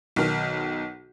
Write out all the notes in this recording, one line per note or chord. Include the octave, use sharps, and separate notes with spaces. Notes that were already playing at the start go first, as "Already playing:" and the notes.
B1 D#3 F6